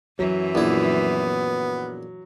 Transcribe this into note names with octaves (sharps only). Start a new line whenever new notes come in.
F#2 E3 F#3
A#1 B3 E4